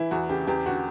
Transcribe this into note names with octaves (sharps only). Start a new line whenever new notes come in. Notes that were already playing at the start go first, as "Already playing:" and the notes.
Already playing: E3 E4
E2 F#4
C#3 G4
E2 G4
D3 F#4